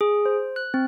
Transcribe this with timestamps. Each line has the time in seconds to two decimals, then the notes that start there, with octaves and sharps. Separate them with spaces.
0.01 G#4
0.26 C5
0.56 F#6
0.74 C4